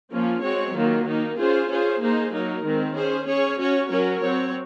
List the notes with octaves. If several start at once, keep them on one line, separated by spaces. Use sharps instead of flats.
F3 A#3 C#4 F4
G#3 C4 F#4 C#5
D#3 F#3 A#3 F4
D#3 A#3 D#4
C#4 F4 G#4 C5
C#4 F4 G#4 C5
A#3 D#4 G#4 C5
F#3 A#3 D#4 A#4
D#3 G#3 C4
C#4 G#4 C5
C#4 G#4 C#5
C#4 F#4 C#5
F#3 C#4 F#4 A#4 C#5
F#3 C4 F#4 C#5